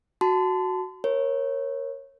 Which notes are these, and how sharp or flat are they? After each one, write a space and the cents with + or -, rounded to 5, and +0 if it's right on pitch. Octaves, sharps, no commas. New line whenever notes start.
F#4 +0 A5 +0 C6 -40
A#4 +10 C#5 -20